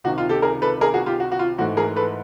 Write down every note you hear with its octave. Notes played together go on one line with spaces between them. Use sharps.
C#2 C3 D#3 F#4
F4
G4 A4
G#4 A#4
A4 B4
G#4 A#4
F#4 G#4
F4 G4
F#4
F#4
F4
G#2 E3 A3 F#4
G#4 A#4
A4 B4